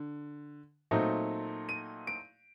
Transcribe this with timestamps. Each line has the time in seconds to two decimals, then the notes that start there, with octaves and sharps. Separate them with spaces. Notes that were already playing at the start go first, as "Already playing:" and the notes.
Already playing: D3
0.91 A#2 F#3 A3 C4 D#4
1.69 D#7
2.07 D7